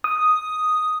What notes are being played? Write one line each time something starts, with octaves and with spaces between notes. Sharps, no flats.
D#6